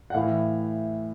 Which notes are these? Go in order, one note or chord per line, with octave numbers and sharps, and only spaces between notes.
F#5
A2 E3 F5